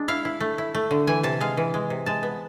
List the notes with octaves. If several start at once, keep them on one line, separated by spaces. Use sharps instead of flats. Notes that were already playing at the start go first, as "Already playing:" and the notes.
Already playing: G#3 D4
E4 F5
E4
A3
E4
A3
D3
E3 G#5
C3 A5
G#3 F5
E3
G#3
C3
G#3 A5
B3